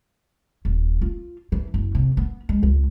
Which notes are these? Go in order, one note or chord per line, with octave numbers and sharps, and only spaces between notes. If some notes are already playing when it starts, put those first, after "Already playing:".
D#1
F4
E3
F#1
C3
B3
G#3
C#2